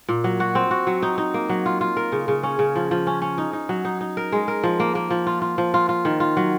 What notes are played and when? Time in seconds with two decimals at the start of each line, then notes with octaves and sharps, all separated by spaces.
0.09 A#2
0.24 F#3
0.40 F#4
0.55 C4
0.71 F#4
0.87 F#3
1.03 D#4
1.18 D#4
1.34 A#3
1.49 F#3
1.66 F4
1.81 F4
1.97 A#4
2.12 C#3
2.28 C#3
2.43 C#4
2.59 C#3
2.75 F3
2.91 F3
3.07 C#4
3.22 C#4
3.38 D#4
3.53 D#4
3.69 F#3
3.85 D#4
4.01 D#4
4.17 A#4
4.32 G#3
4.48 A#4
4.64 F3
4.80 A#3
4.95 A#3
5.11 F3
5.27 F4
5.42 F4
5.58 F3
5.74 F4
5.89 F4
6.05 D#3
6.20 F4
6.37 F#3